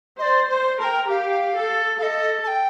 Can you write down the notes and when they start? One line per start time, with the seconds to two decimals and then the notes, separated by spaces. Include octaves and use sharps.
0.19 C5 D5 D#5
0.49 C5
0.79 A#4 A5
0.84 G5
1.09 G4 F5
1.54 A4
1.98 A4 D#5 F5
2.44 A5
2.48 G5